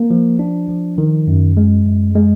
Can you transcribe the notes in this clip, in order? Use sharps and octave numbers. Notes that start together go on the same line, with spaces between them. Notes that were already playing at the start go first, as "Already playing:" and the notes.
Already playing: A#3
F3
D4
F3
D#3
F#2
G#3
F#2
G#3